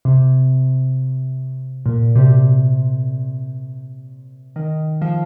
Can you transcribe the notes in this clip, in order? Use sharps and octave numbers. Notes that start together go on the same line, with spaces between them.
C3
A#2
C3
D#3
F3